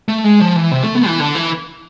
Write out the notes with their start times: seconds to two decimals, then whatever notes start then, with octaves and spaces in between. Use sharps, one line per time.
0.09 A3
0.24 G#3
0.40 F3
0.56 E3
0.71 C3
0.84 A3
0.95 B3
1.07 E3
1.20 D3
1.35 E3